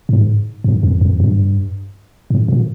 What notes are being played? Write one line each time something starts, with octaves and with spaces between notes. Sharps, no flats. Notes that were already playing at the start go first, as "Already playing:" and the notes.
G#2
G2
F2
F2
G2
G#2
A#2